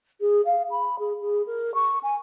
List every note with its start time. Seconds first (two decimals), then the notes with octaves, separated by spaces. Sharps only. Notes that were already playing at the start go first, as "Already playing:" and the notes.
0.21 G#4
0.45 F5
0.71 B5
0.99 G#4
1.21 G#4
1.47 A#4
1.75 C#6
2.03 G#5